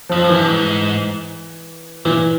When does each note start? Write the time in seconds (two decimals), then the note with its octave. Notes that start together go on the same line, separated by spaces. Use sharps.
0.09 F2 F3
0.24 F#2
0.29 E3
0.36 G2
0.48 G#2
2.05 A#2 E3